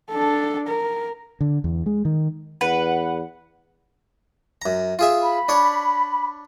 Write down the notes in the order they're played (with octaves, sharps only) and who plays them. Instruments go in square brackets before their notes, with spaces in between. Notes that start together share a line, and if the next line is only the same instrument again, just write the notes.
[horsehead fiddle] D4 A4
A#4
[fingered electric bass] D3
E2
G#3
D#3
[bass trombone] E2 [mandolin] B4 [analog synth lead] F#5
[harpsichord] F#2 A#5
F4 G#4 E5
[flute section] B5
[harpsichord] D4 C#5 D5